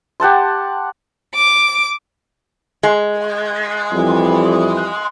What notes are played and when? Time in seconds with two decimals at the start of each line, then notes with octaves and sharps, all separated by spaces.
0.20 G4 F#5 A5 C6
1.35 D6
2.83 G#3
3.92 F2 E3 G3